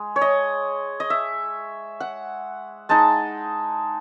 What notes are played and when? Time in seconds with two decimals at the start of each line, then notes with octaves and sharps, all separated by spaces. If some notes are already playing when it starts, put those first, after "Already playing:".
Already playing: G#3
0.16 C#5
0.21 D#5
1.00 D#5
1.10 E5
2.00 F#5
2.89 G#3 D#4 A5